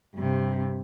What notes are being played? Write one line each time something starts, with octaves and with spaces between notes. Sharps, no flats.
G2 C3